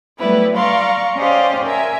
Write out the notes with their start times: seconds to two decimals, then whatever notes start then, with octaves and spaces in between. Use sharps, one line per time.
0.19 F#3 G3 A3 B3 E4 B4
0.56 D5 F5 A#5 C6 C#6
1.16 C#4 G4 C5 D5 D#5 F5
1.65 A#4 E5 G#5